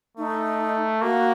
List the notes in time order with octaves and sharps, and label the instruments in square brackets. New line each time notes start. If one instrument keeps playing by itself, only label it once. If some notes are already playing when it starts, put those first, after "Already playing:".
[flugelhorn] A3 [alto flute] D#4
[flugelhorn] A#3 [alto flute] F#4